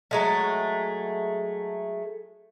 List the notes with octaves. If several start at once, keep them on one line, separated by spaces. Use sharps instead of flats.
F#3 G#3 A3